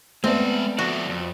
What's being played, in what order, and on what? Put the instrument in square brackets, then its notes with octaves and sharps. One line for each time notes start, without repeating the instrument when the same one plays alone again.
[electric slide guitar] G#3 D5 [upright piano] A3 B3 [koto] C4
[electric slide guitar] F3 A4 D5 [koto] F#4
[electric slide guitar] F2